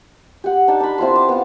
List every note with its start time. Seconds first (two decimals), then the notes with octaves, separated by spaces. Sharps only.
0.44 G4 F#5
0.68 D4 D#4 A5
0.80 D4 B5
0.98 C4 E4 F4 C6
1.11 A5 D6
1.29 B3 F5